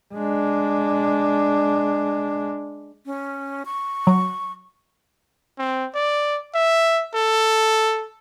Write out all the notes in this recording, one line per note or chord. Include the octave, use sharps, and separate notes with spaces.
G#3 D4
C#4
C#6
F#3
C4
D5
E5
A4